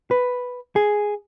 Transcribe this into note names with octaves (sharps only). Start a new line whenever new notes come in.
B4
G#4